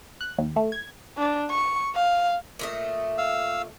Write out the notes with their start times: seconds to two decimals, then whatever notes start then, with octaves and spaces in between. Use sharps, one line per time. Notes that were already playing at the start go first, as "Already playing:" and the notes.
0.21 F#6
0.38 D#2
0.56 A3
0.72 G#6
1.18 D4
1.50 C#6
1.95 F5
2.59 A#2 A3 D#5
3.18 F5 E6